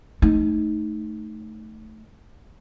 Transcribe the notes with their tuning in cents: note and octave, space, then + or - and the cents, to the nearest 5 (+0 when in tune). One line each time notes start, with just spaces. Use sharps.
A3 -5 D#4 +0